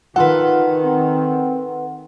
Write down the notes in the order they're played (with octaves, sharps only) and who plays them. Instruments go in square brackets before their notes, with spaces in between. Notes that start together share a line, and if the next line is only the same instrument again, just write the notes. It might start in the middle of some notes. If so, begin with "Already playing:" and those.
[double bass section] D#3 [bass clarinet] F4 [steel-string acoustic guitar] A4 B4 [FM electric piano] F#5
[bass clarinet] C4